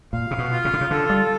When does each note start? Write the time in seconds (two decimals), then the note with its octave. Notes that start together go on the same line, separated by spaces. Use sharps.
0.13 A#2 F5
0.31 C3
0.38 B2
0.52 F4
0.65 C#3
0.73 D3
0.81 C#3
0.91 D3 A4
1.10 G3